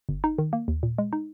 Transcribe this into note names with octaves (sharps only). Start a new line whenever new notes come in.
G1
D#4
D#3
A#3
D#2
A#2
G#3
D#4